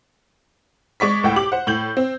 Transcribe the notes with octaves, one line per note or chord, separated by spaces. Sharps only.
G#3 D5 C#6 B6
C#2 A2 F#5 G5
G4 D6 F#7
C5 F#5
A2 G6 F#7
C4